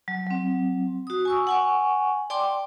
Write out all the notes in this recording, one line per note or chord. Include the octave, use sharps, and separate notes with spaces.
F#3
F#3 C4
F#4 D#6
G#5 C#6 E6
F#5 G#5 C#6
D5 G5 A5 C6 D6